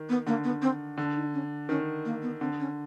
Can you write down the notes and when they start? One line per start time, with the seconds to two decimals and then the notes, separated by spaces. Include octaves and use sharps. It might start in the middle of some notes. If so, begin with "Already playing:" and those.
Already playing: D#3
0.09 B3
0.27 D3 A#3
0.44 B3
0.62 C4
0.98 D3 D4
1.16 D#4
1.33 C#4
1.69 D#3 C#4
2.05 A#3
2.22 B3
2.40 D3 C4
2.59 C#4